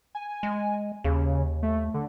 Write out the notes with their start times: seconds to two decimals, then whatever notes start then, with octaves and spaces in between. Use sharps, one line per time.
0.15 G#5
0.43 G#3
1.04 D#2 C#3
1.63 A3
1.94 D3